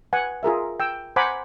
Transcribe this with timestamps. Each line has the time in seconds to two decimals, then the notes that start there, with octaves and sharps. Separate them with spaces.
0.13 B4 F#5 G#5
0.43 F4 G#4 A#4 E5
0.80 G5 E6
1.16 C5 F#5 G#5 A#5 B5 D6